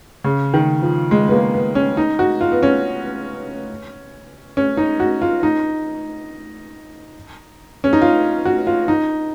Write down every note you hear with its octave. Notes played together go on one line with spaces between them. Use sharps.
C#3
D#3
F3
G#3
B3
A#3
B3
C#4
D#4
F#4
F4
B3
C#4
C#4
D#4
F#4
F4
D#4
C#4
D#4
F4
F#4
F4
D#4